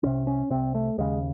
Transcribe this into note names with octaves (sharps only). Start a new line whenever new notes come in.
C2 C3 C#4
C#4
C2 C3 C4
A3
D#2 C#3 G#3